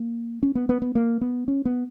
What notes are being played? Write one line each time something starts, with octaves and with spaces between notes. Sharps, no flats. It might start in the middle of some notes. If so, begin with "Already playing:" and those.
Already playing: A#3
C#4
B3
B3
B3
A#3
B3
C#4
B3